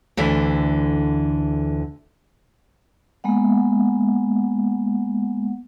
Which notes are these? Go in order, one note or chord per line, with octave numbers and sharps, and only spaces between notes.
D2 D3 E3
G#3 A#3 B3 F#5